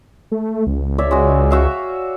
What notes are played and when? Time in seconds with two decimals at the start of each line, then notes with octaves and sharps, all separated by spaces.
0.32 A3
0.67 C#2
0.98 C#5 D5 E5
1.11 G#3 F#4
1.51 F#4 E5 F5